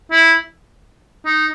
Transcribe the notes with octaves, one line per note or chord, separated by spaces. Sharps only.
E4
D#4